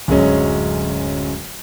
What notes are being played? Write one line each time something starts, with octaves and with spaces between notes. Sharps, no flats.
D1 F#2 F#3 G#3 C#4